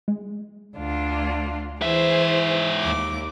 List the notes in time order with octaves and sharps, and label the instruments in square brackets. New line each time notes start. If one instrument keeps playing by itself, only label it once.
[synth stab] G#3
[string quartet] D2 D4 F4
[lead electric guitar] G#2 E5 [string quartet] E3 G#4 C5
[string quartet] D#2 D6